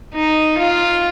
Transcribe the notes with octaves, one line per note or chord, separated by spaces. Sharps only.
D#4
F4